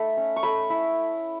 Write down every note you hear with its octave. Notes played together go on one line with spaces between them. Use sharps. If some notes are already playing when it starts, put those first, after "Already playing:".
Already playing: A3 D#4 B5
C#4
C#6
A3 B5
E4